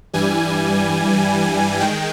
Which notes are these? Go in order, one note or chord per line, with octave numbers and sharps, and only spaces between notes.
G2 E3 G3 G#5
D#3 G#3 G5